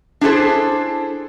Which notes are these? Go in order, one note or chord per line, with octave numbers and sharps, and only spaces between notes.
D4 E4 G#4 A4 C5